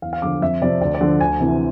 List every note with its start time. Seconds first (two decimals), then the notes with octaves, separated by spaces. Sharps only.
0.02 E2 F5
0.13 F5
0.22 D3 F3 D6
0.42 F2 E5
0.61 C3 F3 D5
0.81 D2 D5
0.95 D5
1.01 D3 F3
1.20 D2 G#5
1.40 C3 E3